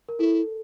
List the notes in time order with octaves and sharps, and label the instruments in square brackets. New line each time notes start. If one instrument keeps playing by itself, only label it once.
[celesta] A#4
[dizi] E4 [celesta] A4